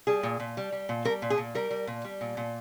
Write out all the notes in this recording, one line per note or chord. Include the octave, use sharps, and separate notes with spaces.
G3 G#4
A#2
A#2
G3
G3
A#2
G3 A#4
A#2
G#4
A#2
G3 A#4
G3
A#2
G3
A#2
A#2